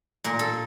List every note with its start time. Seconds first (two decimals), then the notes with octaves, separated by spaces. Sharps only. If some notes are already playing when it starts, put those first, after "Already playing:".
0.24 A#2 A#4
0.39 A4